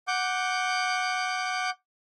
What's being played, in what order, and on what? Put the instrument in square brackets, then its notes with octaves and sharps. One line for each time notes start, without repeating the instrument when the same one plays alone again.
[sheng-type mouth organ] F#5 D6 G6